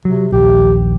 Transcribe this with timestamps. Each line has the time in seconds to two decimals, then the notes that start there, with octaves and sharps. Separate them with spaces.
0.05 C3 F#3
0.32 A#1 D#2 G4